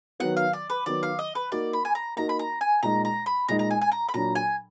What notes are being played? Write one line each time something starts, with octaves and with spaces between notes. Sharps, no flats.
D#3 F#3 B3 F#5
F5
D5
B4
D#3 F#3 B3 D5
F5
D#5
B4
A#3 D#4 F#4 D5
B5
G#5
A#5
A#3 D#4 F#4 A#5
B5
A#5
G#5
A#2 G#3 D#4 A#5
A#5
B5
A#2 G#3 D#4 A#5
A#5
G#5
G#5
A#5
B5
A#2 F#3 D4 A#5
G#5